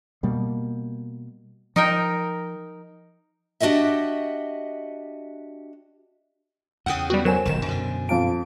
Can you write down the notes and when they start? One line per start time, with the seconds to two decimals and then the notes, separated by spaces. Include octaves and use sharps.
0.23 B2 G3 A#3
1.76 F3 D#4 A#4 G5
3.60 D4 F#4 G4 D#5 E5
6.86 E2 C#3 F#5 G5 D#6
7.10 G3 B3 F#4
7.25 F#3 A#4 C5 G#5 E7
7.46 F1 B1 D#3 E7
7.66 F#2 B2 D3
8.09 F2 F5 A5 D7